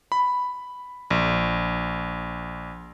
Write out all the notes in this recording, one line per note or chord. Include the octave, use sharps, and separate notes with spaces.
B5
A#1